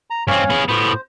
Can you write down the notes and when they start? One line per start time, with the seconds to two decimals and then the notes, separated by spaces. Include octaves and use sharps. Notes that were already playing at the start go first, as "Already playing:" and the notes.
0.10 A#5
0.28 G2 C4 C#4 C#5 F5
0.50 B3 G#4
0.69 A2 B3 C5